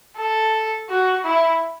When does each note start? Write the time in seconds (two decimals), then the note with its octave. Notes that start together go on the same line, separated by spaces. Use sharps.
0.18 A4
0.89 F#4
1.25 E4